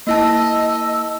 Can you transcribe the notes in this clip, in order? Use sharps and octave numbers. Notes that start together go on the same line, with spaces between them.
A#3 E4 D#5 A5 E6